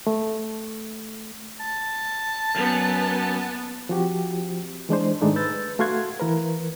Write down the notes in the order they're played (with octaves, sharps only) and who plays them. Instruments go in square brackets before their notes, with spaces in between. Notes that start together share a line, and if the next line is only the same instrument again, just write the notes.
[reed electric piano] A3
[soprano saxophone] A5
[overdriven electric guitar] F#2 [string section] B3
[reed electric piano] F3 C4 F#4 G4
E3 G#3 D4 C5
G#2 D#3 G#3 A3 D4 D#4
B4 E6 G6 A6
A3 F#4 F5 F#5 C6 G#6
E3 A#4 B4